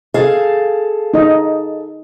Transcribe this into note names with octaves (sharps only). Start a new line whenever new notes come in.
G#4 A4 F5
D#4 D#5